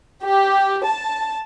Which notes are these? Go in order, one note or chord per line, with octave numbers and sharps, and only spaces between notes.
G4
A5